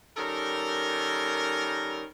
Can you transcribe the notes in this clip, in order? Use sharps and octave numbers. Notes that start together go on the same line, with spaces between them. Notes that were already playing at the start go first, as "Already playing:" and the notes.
D#3 G3 C#4 A4 A#4